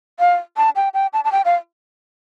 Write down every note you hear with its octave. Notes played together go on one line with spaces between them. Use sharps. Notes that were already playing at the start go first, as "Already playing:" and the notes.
F5
A5
G5
G5
A5
A5
G5
F5